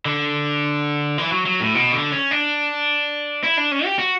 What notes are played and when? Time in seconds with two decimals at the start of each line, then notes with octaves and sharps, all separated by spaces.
0.05 D3
1.18 E3
1.32 F#3
1.46 F#3
1.61 A2
1.75 B2
1.92 D3
2.12 C#4
2.31 D4
3.44 E4
3.57 D4
3.72 C#4
3.85 G4
3.99 F#4